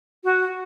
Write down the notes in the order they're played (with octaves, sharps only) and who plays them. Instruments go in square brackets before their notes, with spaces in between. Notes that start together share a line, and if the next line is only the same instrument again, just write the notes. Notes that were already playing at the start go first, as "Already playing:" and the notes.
[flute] F#4